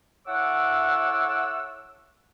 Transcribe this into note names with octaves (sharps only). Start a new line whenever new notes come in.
E4 A4 C#5 F#5 D6 E6